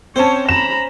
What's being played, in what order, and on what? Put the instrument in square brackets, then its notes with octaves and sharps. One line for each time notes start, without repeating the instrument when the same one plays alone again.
[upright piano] C4 A5 [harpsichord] C#4 C5 [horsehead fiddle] C#5
[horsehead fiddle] A#5 B5 [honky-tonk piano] E7